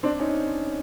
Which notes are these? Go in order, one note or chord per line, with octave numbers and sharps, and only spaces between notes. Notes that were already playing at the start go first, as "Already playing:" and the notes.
C4 D4
C#4 D#4